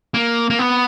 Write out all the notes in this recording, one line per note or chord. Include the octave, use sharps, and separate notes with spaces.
A#3
A#3
B3